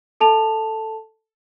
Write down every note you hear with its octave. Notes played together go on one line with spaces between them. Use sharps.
A4 A5 F7